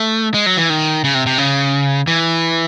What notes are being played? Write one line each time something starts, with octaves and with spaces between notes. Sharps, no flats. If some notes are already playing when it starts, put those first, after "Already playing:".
Already playing: A3
G#3
F#3
E3
D#3
C#3
C3
C3
C#3
E3